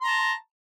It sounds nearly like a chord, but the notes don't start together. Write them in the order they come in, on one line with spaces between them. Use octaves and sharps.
C6 A#5 A5